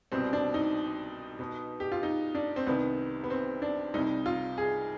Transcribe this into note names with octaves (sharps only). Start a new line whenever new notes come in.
C2 B2 G3 C4
D4
D#4
B2 B3
G4
F4
D#4
D4
C4
C2 C3 D#3 B3
B3
C4
D4
C2 C3 G3 D#4
F4
G#4